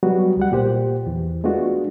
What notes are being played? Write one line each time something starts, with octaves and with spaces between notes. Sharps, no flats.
F#3 G3 B3 F#4
C#2 G3 F#5
A#2 G4 C5
E2 E3
G#3 A3 B3 D4 F4 F#4